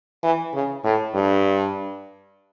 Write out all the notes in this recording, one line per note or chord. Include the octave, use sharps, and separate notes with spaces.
E3
C#3
A2
G2